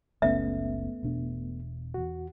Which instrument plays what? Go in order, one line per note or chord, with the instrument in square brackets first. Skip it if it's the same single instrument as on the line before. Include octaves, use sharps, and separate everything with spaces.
[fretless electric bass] F#1 C#2 C#4 [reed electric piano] A3 B3 [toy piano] E5
[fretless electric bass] E1 B2 D4
[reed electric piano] E2 F#4